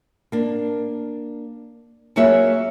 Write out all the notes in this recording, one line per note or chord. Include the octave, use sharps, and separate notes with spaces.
A#3 D4
F#3 A#3 F#4 G#4 C#5 E5